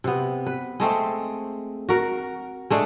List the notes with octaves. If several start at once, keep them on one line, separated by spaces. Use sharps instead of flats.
C3 B3
B4
G#3 A3 C4
F#4 A#4
G#3 A3 D4